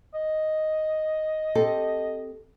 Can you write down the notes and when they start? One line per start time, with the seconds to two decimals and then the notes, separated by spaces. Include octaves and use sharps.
0.14 D#5
1.55 C4 G4 A4